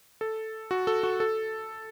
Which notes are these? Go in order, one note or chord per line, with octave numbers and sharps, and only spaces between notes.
A4
F#4
A4
F#4
A4